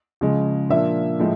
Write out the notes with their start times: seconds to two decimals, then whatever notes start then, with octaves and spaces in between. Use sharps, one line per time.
0.21 C#3 F3 G#3
0.69 A#2 F3 A#3 D4 E5
1.19 A2 F3 G#3